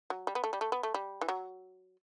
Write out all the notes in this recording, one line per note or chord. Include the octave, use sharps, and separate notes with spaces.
F#3
G3
B3
A3
G3
A3
B3
A3
G3
E3
F#3